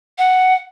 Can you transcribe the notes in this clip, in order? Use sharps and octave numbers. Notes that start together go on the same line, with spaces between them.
F#5